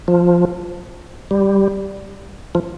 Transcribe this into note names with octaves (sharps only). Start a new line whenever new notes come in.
F3
G3
F3